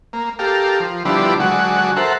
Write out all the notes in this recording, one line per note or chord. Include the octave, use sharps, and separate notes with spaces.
A#3
G4 A4 A#4 F5
F3
D3 F3 G3 B3 D4 E4
D3 F#3 G#3 F#4
A4 A#4 C5 E5 F#5